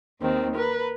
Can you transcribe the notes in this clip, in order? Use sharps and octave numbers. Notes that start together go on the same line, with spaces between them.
D#2 D#3 C4
A#4 B4